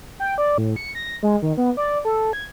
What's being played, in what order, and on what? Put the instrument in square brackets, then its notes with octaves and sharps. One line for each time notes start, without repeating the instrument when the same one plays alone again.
[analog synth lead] G5
D5
A2
C#7
A#6
G#3
D#3
B3
D5
A4
G#6